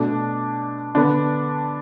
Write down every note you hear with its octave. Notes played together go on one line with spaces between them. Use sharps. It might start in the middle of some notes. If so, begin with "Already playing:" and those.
Already playing: B2 A3 D4
D3 B3 D4